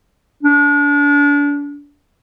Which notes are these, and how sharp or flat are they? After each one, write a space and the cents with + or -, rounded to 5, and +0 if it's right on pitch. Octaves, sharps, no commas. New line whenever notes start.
D4 -30